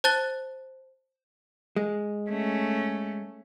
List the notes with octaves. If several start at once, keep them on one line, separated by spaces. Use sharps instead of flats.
C5 A5 F#6 A6 G7
G#3
A3 C#4